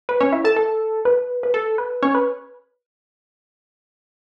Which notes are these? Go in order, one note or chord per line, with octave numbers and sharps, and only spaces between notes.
B4
C#4 C#5
E4 E5
A4 A5
A4
B4
B4
A4
B4
C#4 C#5
B4